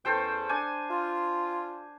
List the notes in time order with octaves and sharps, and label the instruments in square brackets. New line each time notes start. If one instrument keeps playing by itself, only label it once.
[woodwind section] E2 C#4 [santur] A4 C5 G5
[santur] D4 G#5
[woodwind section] F4